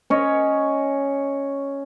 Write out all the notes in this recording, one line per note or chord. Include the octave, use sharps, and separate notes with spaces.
C#4 C#5 D#5